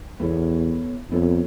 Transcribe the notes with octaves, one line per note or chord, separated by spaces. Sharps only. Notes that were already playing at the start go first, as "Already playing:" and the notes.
E2 B3 E4 A4 C#5
F2 B3 E4 A4 C#5